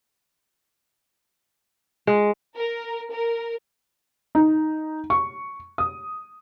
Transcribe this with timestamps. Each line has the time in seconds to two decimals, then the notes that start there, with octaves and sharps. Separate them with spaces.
2.07 G#3
2.56 A#4
3.12 A#4
4.35 D#4
5.10 C#6
5.78 D#6